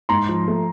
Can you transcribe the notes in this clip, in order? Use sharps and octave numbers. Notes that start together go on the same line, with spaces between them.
G#2 A#5 C6
F3
A3